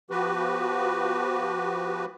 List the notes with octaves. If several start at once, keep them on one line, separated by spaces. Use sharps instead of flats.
F3 B3 F#4 G4 B4